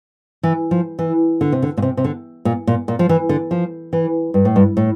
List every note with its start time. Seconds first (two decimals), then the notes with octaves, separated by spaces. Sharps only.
0.43 E3
0.71 F3
0.99 E3
1.41 D3
1.52 C3
1.63 D3
1.77 A#2
1.82 C3
1.97 C3
2.04 D3
2.45 A#2
2.67 A#2
2.88 A#2
2.99 F3
3.09 E3
3.29 D3
3.51 F3
3.93 E3
4.34 G2
4.45 A2
4.56 G2
4.77 A2